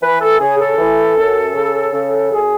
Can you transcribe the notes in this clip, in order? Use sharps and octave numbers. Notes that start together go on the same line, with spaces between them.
E3 B4
A4
C#3 G#4
A4
E3
F#2
C#3
C#3
F#2 G#4